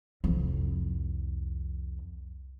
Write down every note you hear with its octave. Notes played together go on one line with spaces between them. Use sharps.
C2 F2